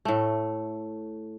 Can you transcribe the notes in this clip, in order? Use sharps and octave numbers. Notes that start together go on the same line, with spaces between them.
A2 A3